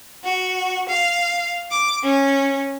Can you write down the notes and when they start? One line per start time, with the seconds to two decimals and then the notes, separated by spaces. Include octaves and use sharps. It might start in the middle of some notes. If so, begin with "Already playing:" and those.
0.23 F#4
0.89 F5
1.71 D6
2.03 C#4